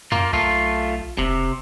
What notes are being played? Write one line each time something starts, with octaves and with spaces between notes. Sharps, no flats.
F#2 A#3 F4
B1 A3 F4
E1 C3